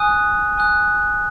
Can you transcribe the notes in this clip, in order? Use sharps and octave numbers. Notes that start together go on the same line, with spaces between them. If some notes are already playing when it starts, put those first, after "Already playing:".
Already playing: G#5 D#6 F#6
G#5 D#6 F#6